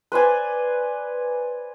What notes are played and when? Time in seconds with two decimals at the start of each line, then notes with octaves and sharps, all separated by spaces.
0.12 B4 C5 D5 G#5